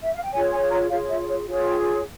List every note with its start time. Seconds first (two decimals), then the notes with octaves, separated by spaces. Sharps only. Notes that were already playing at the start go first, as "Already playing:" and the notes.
0.02 E5
0.12 F5
0.22 G5
0.32 F4 G#4 C#5 G#5
0.52 G#5
0.70 A#5
0.89 F4 G#4 C#5 F5
1.09 E5
1.28 C#5
1.47 F4 G#4 C#5
1.66 G5